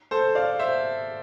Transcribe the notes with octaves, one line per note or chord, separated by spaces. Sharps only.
A4 C5
D5 F5
C5 E5